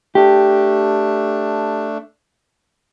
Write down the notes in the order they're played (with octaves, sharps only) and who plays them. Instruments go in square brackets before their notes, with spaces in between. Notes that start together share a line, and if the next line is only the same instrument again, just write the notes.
[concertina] A3 D4 [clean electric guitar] G4